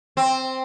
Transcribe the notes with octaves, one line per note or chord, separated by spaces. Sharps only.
C4